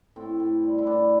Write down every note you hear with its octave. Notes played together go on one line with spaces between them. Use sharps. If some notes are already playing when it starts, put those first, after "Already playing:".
A2 C4
A2
G3
E4
A2 D4